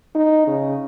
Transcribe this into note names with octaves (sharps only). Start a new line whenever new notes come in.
D#4
C#3